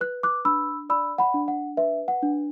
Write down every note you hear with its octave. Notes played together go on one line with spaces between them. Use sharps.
B4 F#6
D6 F#6
D4 B5 E6
D5 B5 E6
F#5 B5
D4
F#5
B4 E5
F#5
D4